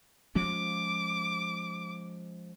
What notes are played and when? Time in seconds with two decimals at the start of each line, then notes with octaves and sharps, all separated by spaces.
0.35 F3 G#3 C#4 D6